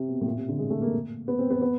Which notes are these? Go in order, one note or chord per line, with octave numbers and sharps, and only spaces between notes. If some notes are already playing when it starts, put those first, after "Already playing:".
Already playing: C3
B2
A2
A#2
C3
D3
G#3
A3
A#3
B3
C4
B3
B3